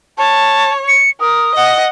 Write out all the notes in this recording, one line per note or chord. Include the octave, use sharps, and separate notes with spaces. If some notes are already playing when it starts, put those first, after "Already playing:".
C#5 A5
C#7
A#4 D#6
D#5 F#5